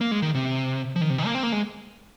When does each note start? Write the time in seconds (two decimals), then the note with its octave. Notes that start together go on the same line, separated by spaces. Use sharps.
0.01 A#3
0.11 G#3
0.22 D#3
0.35 C3
0.96 F3
1.01 D#3
1.10 C3
1.18 D#3
1.26 A#3
1.34 C4
1.43 A#3
1.52 G#3